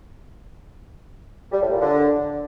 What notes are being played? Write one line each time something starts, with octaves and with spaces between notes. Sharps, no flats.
G3
A2
A#2
D3